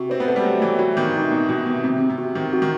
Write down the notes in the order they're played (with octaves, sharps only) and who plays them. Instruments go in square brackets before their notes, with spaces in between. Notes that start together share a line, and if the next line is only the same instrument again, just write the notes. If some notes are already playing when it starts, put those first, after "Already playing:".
Already playing: [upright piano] C3 [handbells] F#4
[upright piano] C4 [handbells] B4
[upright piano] B3
[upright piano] A3 [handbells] B4
[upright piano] G3
[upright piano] F#3 [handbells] A3
[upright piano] E3 [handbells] A3
[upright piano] E3 [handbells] F#4
[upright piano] D#3 [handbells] B3
[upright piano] C3 [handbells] D#4
[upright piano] B2 [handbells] D#4
[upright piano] B2 [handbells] F#4
[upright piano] C3 [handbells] B3
[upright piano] C3 [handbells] C4
[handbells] C4
[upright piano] C3
[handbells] F#4
[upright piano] D#3 [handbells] C4
[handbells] F#4
[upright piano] D#3